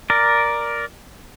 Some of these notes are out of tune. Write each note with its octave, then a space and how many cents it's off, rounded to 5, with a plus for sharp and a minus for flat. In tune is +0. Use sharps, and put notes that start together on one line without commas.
A#4 +5 D5 +0